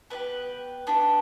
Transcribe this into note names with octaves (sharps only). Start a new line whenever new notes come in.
B3 D4 G4 B4
B3 D4 G4